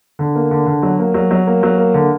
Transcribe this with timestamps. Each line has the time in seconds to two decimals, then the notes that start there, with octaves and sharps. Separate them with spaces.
0.19 D3
0.35 A#3
0.51 D3
0.66 D3
0.83 F#3
0.99 A#3
1.14 F#3
1.31 F#3
1.47 A#3
1.63 F#3
1.78 A#3
1.94 D3